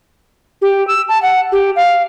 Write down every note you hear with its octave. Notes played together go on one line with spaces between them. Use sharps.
G4
E6
A5
F#5
G4
F5